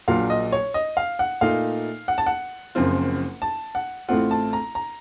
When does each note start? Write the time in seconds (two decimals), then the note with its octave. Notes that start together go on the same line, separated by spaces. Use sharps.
0.08 A#1 A#2 F#3 F5
0.30 D#5
0.52 C#5
0.74 D#5
0.97 F5
1.19 F#5
1.41 A#2 A3 D#4 F5
2.08 F#5
2.18 A5
2.26 F#5
2.75 F#1 F#2 F3 C4 F4
3.42 A5
3.75 F#5
4.08 A1 A2 A3 C4 F4 F#5
4.31 A5
4.53 A#5
4.75 A#5